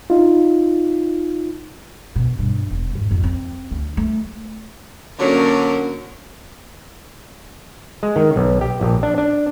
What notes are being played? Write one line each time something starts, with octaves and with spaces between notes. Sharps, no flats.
D#4 F4
B2
G2
E1
G#2
F2
C4
D2
A3
D3 F#3 A#3 C#4 A#4
G#3
D#3
B1
G4
A#1
D4
D4